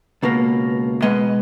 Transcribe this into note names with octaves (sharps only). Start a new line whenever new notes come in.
C#2 B2 A#3
B2 G#3 B3 D#5